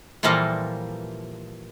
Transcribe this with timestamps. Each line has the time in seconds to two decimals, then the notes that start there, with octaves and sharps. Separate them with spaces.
0.23 A#2 E3 F3 G3 A#3 A4